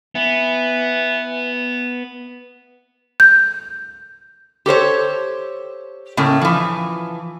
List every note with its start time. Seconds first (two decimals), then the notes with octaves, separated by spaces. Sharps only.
0.15 E3 B3
3.20 G6
4.66 G4 A4 C5 C#5
6.17 A2 C#3 A3 A#3 C#4
6.41 E3 F3